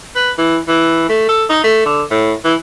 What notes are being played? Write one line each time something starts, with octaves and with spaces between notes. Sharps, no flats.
B4
E3
E3
A3
A4
D#4
A3
D3
A2
E3